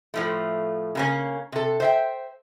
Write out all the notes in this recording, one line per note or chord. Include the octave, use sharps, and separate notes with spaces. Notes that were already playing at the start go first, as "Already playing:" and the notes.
A2 F3 A3
C#3 A#3 C#4
C3 A4
C5 E5 G5